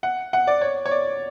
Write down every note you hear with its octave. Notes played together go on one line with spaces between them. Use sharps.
F#5
F#5
D5
C#5
C#5
D5